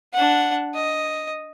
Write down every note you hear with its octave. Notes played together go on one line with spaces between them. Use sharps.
D4 F#5
D#5